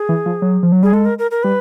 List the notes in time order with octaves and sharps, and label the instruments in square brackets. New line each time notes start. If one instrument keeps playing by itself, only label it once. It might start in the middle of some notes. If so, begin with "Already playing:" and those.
Already playing: [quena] G#4
[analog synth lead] E3
F3
F#3
F3
F#3
[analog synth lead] G3 [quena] G#4
[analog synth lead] G#3 [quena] A4
[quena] A#4
A#4
A#4
[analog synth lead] G3 [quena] B4